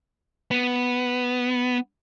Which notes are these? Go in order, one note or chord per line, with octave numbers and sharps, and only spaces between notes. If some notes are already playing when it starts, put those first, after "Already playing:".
B3